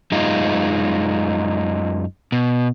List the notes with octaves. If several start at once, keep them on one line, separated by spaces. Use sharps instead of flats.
F#2 G#3 D#4 F4
B2